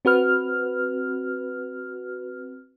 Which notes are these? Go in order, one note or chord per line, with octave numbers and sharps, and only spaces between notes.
C4 F#4 B4 F6